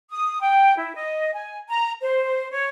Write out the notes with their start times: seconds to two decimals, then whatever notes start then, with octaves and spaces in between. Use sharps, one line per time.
0.10 D#6
0.41 G5
0.78 E4
0.95 D#5
1.34 G#5
1.69 A#5
2.00 C5
2.51 C#5